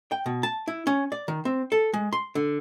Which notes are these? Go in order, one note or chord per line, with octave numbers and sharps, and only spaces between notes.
G5
B2
A5
E4
C#4
D5
D#3
C4
A4
G#3
C6
D3